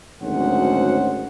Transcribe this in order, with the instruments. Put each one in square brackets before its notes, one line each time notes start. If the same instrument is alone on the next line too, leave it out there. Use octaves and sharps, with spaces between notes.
[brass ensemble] G#1 D2 F#3 C#4 C5 F#5